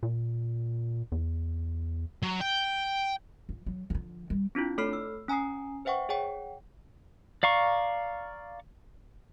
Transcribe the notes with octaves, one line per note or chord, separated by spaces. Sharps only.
A#2
E2
F#3
G5
F3
F#3
D3 F3
G3
C4 D4 E4 F4
A3 A4 C#5 B5 F6 C7
E6
C#4 G#5 A#5 D#6 C7
B4 C5 E5 F#5 G5 C#6
G#4 C#5 F#5 G5
D5 F5 A#5 C#6